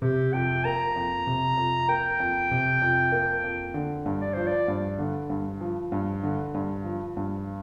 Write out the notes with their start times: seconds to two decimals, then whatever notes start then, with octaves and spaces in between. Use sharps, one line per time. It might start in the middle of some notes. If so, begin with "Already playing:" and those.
0.02 C3 G4
0.33 F2 G5
0.65 A#3 A#5
0.96 F2
1.27 C3
1.57 F2
1.88 A#3 G5
2.20 F2
2.51 C3
2.82 F2
3.12 A#3
3.44 F2
3.74 D3
4.06 G2
4.21 D5
4.33 F3 C5
4.47 D5
4.68 G2
4.98 D3
5.30 G2
5.61 F3
5.92 G2
6.23 D3
6.54 G2
6.84 F3
7.17 G2